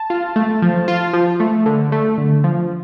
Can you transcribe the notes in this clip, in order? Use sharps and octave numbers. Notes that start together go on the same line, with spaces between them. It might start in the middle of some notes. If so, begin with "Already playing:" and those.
Already playing: A5
F4
A3
F3
F4
F3
A3
D3
A3
D3
F3